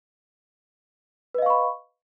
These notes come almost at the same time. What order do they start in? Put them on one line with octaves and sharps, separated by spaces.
B4 D#5 F5 C#6 B5